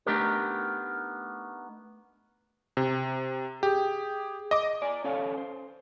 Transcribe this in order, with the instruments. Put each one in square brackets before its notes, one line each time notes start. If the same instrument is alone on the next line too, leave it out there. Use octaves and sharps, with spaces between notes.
[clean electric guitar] A3 B3 D4 D#4 G4 A#4
[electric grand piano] C3
[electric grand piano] G4 [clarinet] G#4
[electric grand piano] D#5 D6
[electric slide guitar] D5 G#5
C#4 A4 C#5 F5
C5